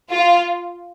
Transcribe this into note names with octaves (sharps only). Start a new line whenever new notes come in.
F4